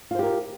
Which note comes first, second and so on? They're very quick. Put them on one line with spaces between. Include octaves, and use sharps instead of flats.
F4 C5 G4 A#4